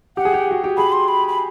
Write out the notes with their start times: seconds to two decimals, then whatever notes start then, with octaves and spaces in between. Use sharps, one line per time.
0.17 G4 F#5
0.25 G#4
0.34 G4
0.51 F#4
0.64 G4
0.77 G#4 B5
0.92 C6
1.08 B5
1.28 B5